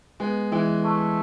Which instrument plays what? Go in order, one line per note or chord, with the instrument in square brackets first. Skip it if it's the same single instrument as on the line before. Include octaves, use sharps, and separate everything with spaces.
[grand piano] G#3 B3
E3 G#3
[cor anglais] A3